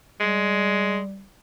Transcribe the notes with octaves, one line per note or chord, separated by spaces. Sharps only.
G3 G#3